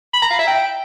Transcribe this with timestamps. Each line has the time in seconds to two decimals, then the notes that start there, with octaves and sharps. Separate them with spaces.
0.14 B5
0.22 A#5
0.31 F5
0.39 E5
0.47 G5